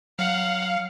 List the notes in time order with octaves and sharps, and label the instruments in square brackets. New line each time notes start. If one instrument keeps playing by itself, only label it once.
[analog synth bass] F#3 [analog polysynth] F5 [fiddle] F#5